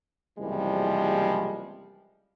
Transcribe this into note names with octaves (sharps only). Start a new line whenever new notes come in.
F#1 C2 E3 F3 G3 G#3